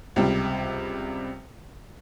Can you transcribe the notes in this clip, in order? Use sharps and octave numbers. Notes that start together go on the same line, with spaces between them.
C#2 C3 G3